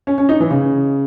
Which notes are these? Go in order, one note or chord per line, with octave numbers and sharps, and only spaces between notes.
C#4
C#4
D#4
E3
C#3